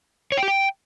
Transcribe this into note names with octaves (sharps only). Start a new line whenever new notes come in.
C#5
G5
G4
G5